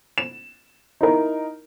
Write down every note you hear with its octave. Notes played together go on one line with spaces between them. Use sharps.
E7
D#4 E4 A#4